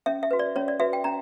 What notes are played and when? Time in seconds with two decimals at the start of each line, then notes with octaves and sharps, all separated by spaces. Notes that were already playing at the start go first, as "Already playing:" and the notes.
0.06 C#4 E5
0.23 E5
0.31 F#4 B4
0.39 D5
0.56 C#4 C#5
0.68 D5
0.80 F#4 B4 E5
0.93 G5
1.04 C#4 A#5